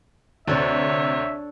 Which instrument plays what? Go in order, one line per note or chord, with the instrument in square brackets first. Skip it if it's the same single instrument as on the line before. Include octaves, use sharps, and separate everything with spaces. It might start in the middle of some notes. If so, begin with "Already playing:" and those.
[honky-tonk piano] D2 C3 [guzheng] D4 A4 [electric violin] C#5 [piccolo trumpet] E5